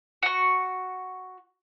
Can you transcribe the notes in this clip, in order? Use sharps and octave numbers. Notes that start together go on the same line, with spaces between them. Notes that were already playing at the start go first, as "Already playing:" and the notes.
F#4 C#6